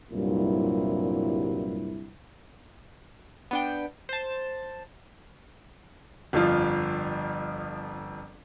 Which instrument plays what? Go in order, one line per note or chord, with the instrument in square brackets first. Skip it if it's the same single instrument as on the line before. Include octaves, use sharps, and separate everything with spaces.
[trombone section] C2 G2 A#2 F#3 E4
[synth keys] B3 D4 G5
C5 A5
[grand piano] G1 F2 F3 F4